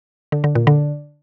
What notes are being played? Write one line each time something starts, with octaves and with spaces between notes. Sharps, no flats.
D3
D3
A#2
D3